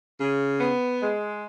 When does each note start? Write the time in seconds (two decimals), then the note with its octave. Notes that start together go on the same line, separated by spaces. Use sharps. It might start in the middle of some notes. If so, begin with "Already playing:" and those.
0.20 C#3
0.60 B3
1.01 G#3